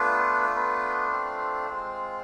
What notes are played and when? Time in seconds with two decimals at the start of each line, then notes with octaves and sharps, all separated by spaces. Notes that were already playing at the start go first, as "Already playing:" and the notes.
Already playing: A3 B3 D4 F4 B4
0.56 B3 B4
1.12 C4 C5
1.69 G#3 C4 F4